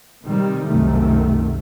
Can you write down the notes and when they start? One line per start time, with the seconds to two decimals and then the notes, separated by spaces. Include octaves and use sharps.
0.24 C3 D#3 G3
0.68 C2 F#2 C3 D#3 A3